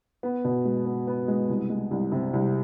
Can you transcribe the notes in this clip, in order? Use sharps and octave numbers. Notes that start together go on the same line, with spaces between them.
B3
B2
G#3
B3
B3
G#3
C2
G#3
C2
C3
C2